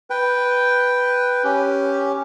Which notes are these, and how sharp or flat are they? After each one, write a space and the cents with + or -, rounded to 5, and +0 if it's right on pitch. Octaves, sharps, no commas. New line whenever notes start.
B4 +0 G5 +0
C#4 +5 G4 +0